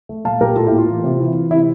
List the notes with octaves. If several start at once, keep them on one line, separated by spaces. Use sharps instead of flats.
A3
A#2 F5 A5
A#2 G4 A#4
A2 F4 A4
E4 G4
A#3
F4
E3
C3
E3
E3
C3 E4